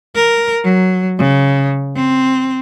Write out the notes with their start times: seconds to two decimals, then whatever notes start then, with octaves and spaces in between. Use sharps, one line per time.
0.15 A#4
0.64 F#3
1.18 C#3
1.96 C4